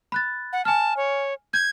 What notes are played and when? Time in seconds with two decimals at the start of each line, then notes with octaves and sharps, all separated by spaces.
0.12 B5 F#6 A6
0.53 F#5
0.65 G#5 A5 F6
0.97 C#5
1.53 G6 G#6